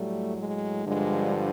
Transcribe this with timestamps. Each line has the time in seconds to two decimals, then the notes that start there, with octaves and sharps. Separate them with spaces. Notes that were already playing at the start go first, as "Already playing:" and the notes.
Already playing: A2 F#3 G3 A3
0.36 G#3
0.86 G2 D3 F3 G#3